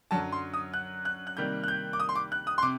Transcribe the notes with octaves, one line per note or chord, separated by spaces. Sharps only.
F#2 D3 F#3 A5
C6
D#6
F#6
F#6
F#6
C3 D#3 G3 A#3 G6
F#6
G6
D6
D#6
C6
D6
F#6
D#6
C6
C3 D6